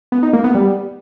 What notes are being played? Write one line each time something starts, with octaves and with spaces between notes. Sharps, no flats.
B3
D#4
A#3
B3
G3